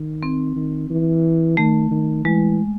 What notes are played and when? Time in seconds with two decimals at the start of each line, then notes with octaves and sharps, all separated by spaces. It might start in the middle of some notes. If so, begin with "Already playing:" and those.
Already playing: D#3
0.23 C4
0.56 D#3
0.90 E3
1.57 D#3 A3
1.91 D#3
2.25 E3 G#3